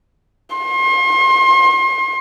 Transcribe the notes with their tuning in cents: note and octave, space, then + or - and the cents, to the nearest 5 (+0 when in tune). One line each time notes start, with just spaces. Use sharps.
C6 +40